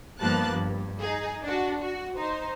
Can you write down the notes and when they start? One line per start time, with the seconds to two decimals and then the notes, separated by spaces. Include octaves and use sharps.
0.19 G2 F3 A#3 B3 A5 F#6
0.51 G2
1.00 D#4 G#4
1.43 D4 F#4
1.81 F#4
2.18 D#4 C5